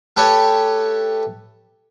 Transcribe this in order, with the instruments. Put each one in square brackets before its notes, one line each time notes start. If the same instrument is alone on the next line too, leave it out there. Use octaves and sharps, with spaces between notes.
[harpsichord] A3 G4 A4 B4 C#5